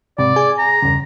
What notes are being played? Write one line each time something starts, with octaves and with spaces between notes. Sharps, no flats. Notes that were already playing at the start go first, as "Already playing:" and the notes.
G#2 C3 D5
G#4 G#5
A#5
E2 G2 C#3